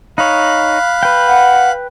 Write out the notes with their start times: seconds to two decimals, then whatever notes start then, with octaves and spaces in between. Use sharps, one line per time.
0.18 D#4 C#5 F5 B5 F#6
1.03 B4 G5
1.28 F#5